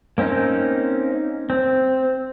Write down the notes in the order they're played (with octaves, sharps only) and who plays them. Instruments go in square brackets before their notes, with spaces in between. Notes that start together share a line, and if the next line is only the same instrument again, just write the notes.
[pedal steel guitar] A#3 C4 C#4 D#4
C4